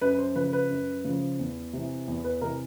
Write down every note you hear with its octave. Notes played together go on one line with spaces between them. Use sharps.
F#2 B4
C5
C#3 F3 B4
B4
F#2
C#3 F3
E2
C3 E3
E2
B4
C3 E3 A#4